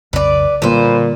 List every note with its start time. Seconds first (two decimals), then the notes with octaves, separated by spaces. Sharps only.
0.13 B1 F2 C#3 B4 D5
0.62 A#2 D3 G3 A#3 B4 C5